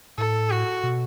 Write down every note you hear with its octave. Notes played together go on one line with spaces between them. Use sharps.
A2 A4
F#4
B2